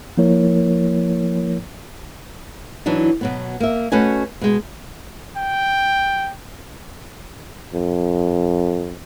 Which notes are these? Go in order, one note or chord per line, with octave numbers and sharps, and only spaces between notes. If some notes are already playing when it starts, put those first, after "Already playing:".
F3 A#3 E4 A#4 C#5
E3 F#3 D4 D#4
B2 F#3 B3
A#3 E5
A3 C#4 F#4 B4 D#5 G#5
B2 G#3
G5
F2